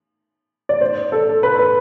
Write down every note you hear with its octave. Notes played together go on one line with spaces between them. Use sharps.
D5
C5
A4
B4
B4